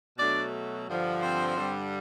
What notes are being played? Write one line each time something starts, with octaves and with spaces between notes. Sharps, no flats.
B2 F#3 A3 D4 D5
G2 D3 F3
C4 C5
G2 D3 G3